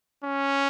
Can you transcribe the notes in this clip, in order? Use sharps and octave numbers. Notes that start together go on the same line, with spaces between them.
C#4